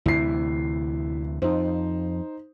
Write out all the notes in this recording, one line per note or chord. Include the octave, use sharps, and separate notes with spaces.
D2 C3 E3 E4 C7
F2 D#4 C5